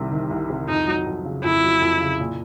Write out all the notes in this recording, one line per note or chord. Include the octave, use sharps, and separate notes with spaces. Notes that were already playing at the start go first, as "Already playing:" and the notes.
Already playing: C2 C3 D#3 G3
D#3
C2
C3
F2 D#4
F#3
F2
C#3
F2 E4
F#3
F2
C#3
A#2